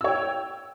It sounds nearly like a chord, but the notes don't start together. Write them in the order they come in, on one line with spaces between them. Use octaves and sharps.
E6 C#5 G5